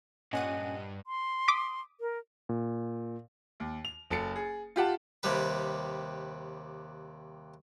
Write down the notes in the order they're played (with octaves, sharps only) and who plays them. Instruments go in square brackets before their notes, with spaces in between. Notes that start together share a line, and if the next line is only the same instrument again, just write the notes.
[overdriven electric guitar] G2 [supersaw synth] A#2 F#5 D#7 [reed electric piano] C#4 G#5 [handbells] D#5
[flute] C6
[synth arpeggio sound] D6 D#6 B6
[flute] A#4
[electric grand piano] A#2
[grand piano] D#2
F7
F#1 A4 A6 C#7
G#4
F4 G4 F#5 A5
[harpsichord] D#2 C3 G3 B4